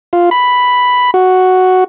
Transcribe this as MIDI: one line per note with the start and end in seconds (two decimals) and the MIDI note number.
0.13 0.30 65
0.31 1.11 83
1.14 1.84 66